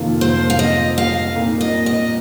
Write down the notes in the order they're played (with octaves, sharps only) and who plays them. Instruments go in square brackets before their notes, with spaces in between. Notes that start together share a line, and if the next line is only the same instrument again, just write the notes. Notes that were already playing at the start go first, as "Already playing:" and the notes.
Already playing: [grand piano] F2 C3 D#3 A#3 F4
[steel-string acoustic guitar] C5
F5
D#5
F5
[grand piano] A#2 A#3 D#4 A#4
[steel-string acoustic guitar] D#5
D#5